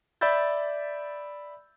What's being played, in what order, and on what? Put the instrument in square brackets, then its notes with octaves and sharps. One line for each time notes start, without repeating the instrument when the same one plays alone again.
[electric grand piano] D5 E5 B5 E6 G6 A6